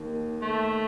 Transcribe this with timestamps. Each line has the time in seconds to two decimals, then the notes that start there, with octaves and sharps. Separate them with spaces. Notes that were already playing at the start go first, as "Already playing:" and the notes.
Already playing: D#2 D#3
0.42 A3